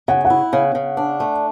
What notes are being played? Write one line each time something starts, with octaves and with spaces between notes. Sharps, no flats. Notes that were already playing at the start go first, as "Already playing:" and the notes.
C#3 F#5
F#5
E4
C#3
C#3
D4
A3